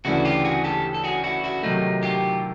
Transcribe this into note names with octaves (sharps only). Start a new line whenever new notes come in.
D2 C#3 E3 A3 D4 E4 F#4
F4 G4
F#4 G#4
G4 A4
A4
F#4 G#4
E4 F#4
E4 F#4
C3 D#3 F#3 A3 D#4 F4
F4 G4